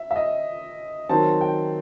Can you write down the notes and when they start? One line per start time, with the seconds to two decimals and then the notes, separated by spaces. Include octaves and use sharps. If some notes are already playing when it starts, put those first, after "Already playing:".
Already playing: E5
0.11 E5
0.16 D#5
1.09 D#3 F#3 C4 A5
1.41 G5